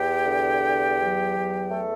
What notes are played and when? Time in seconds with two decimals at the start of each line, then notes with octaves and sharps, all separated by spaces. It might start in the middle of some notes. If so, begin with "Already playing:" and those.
Already playing: E2 G4 G5
0.26 D3
0.63 E2
0.99 F#3
1.35 E2
1.71 A3 A4